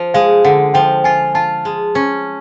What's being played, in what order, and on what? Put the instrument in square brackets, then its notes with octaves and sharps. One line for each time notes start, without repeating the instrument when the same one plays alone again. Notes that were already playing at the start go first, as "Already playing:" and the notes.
Already playing: [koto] F3
[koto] G#3 [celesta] F5
[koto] D3 [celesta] F#5
[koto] F3 [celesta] G5
[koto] F4 [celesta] G#5
[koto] F4 [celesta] A5
[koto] G#3
C#4